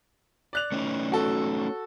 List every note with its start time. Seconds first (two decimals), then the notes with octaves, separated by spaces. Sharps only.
0.53 D5 F#6 F7
0.72 A3 C#4 D#4
1.12 F#4 A4